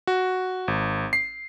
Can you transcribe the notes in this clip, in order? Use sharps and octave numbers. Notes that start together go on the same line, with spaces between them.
F#4
G#1
C7